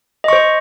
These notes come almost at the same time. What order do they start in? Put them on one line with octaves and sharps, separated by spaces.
D#5 C#6 C5